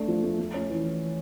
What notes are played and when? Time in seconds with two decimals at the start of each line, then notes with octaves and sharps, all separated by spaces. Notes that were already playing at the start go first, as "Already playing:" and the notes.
Already playing: A3 D4
0.08 F3
0.23 A3
0.39 A3
0.54 C#4
0.70 E3